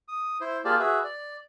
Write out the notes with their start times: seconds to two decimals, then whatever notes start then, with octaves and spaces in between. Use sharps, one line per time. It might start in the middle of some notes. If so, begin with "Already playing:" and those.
0.08 D#6
0.41 E4 C5
0.65 A#3 F4 G4 G#4 D5 A5
0.79 F#4 G#4 B4 E5
1.04 D5